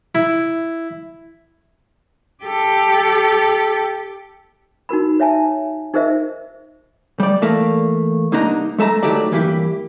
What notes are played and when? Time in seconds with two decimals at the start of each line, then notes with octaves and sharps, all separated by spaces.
0.15 E4
2.44 G4 A4
4.89 D#4 F#4 A#4 B5
5.20 C#5 E5 G#5 A5
5.94 D#4 G#4 A#4 C5 D#5 E5
7.20 G3 D5
7.42 E3 A3 A#3
8.32 C2 A#3 D4 D#4 A#5
8.78 G#3 A3 A5 A#5
9.03 A2 D#3 F#3 A3 G4 D5
9.32 G2 E3 A#3 E4 G4